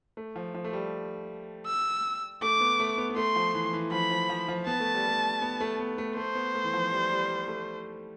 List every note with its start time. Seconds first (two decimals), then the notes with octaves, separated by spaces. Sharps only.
0.17 A3
0.36 F3
0.55 F3
0.65 A3
0.73 G3
1.67 E6
2.42 A3 D6
2.60 B3
2.80 A3
2.98 B3
3.10 B3
3.16 A3 C6
3.36 F3
3.54 E3
3.73 E3
3.92 F3 B5
4.11 F3
4.29 F3
4.48 F3
4.67 B3 A5
4.80 A3
4.94 G3
5.08 A3
5.42 B3
5.60 A3
5.79 B3
5.98 A3
6.17 A3 C5
6.35 B3
6.54 A3
6.64 E3
6.73 F3
6.92 G3
7.11 G3
7.29 G3
7.48 A3